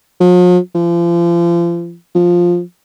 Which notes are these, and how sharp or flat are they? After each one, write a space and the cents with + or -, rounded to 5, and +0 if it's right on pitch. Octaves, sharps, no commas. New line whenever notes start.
F3 +45
F3 -35
F3 +5